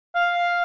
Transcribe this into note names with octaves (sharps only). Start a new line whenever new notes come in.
F5